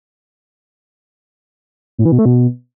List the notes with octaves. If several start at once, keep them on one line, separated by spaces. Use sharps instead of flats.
A2
E3
B2
A3
B2